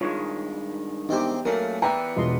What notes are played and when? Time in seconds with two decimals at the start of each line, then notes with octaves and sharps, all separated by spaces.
0.01 G2 D#3 G#3 F4 C#5
1.09 E2 C4 D#4 G4 C5
1.45 F#2 F#3 A3 A#3 A#4
1.82 E3 B3 D4 E5 G5 A#5
2.16 E1 F4 D#5 C6